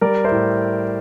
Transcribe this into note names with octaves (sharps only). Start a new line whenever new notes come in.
G3 A#4 D5
C5 E5
A2